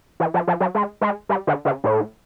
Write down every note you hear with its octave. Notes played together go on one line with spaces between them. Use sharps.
E3
F3
F3
F#3
G#3
G#3
G3
D3
C#3
A2